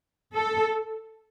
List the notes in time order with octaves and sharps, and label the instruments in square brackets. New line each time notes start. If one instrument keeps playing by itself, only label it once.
[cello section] A4